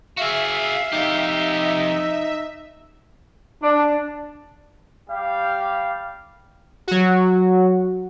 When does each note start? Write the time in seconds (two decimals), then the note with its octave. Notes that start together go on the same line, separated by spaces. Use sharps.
0.17 F#4 G#4 E5 F5
0.92 F2 D#4 G4
3.63 D4
5.10 G3 G4 F5
6.88 F#3 F#4